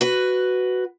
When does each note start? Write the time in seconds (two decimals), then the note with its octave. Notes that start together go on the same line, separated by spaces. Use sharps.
0.01 F#4 B4